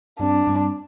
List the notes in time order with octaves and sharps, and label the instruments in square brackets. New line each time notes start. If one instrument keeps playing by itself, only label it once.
[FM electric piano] G2 G3 C4 [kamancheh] D4
[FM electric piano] G2 G3 C4